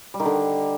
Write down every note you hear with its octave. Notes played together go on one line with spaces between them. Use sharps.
G3
D#3
D3